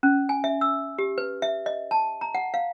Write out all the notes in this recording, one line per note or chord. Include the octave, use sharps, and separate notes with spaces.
C#4
G#5
E5
E6
G4
B4
E5
D#5
A5
A#5
F#5
F5